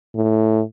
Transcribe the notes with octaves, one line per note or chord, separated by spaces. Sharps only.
A2